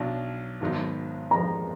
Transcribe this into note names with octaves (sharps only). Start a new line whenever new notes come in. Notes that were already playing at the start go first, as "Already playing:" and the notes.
Already playing: B1 B2 F#3 D4
G#1 G#2 F#3 B3 D#4
F2 F3 G#3 D4 A#5